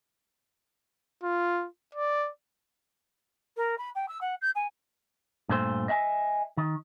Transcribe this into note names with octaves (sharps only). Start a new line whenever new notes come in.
F4
D5
A#4
B5
G5
E6
F#5
G6
G#5
G2 A#2 A3 C5
D#5 E5 F#5 G#5
D#3